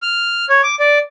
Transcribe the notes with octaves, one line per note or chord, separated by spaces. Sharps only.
F6
C#5
D6
D5